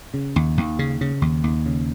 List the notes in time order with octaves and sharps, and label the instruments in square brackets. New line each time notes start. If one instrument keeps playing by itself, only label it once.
[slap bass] C#3
D#2
D#2
C#3
C#3
D#2
D#2
C#3